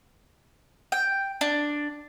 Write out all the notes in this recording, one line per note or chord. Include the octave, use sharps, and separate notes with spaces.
G5
D4